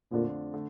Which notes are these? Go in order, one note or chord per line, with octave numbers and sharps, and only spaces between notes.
F2 A#2 D3 A3 D4 F4
D3 A3